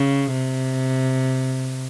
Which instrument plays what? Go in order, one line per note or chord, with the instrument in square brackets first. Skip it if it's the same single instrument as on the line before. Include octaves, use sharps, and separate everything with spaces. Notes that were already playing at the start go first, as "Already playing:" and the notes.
Already playing: [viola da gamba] C#3
C3